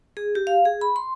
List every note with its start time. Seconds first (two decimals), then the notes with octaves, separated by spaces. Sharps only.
0.17 G#4
0.35 G4
0.47 F5
0.65 G#4
0.81 B5
0.96 C6